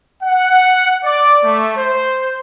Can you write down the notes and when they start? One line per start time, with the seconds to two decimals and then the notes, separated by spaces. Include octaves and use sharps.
0.23 F#5
1.04 D5
1.44 A3
1.76 C5